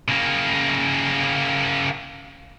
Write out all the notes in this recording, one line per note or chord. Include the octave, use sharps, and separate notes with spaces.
C#3 A#3